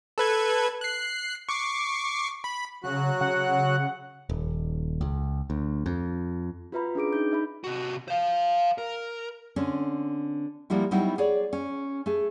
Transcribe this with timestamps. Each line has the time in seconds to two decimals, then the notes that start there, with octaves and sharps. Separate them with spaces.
0.18 A4 B4 G#6
0.81 F#6 C7
1.49 C#6 D6 C7
2.44 B5
2.84 C#3 F#3 F#4 F#6
3.21 C#3 F#5
4.29 D#1
5.01 C#2
5.50 D2
5.86 F2
6.72 F4 F#4 B4 E5 A#5 B5
6.95 C#4 D4 G#4 D6 D7
7.13 D#4 G6
7.31 D#4 E5 B5
7.64 C3 F#4
8.08 C5 F5
8.78 A#4
9.56 D3 C4 C#4
10.70 F3 G3 A#3 E4 F#4
10.91 F#3 G3 B3 D#4 E4
11.18 G#4 C#5 D5
11.53 C#4
12.06 A3 G#4